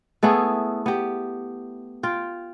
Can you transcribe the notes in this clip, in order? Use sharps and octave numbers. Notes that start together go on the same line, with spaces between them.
A3 B3 E4 G#4
B3 G4
F4 G5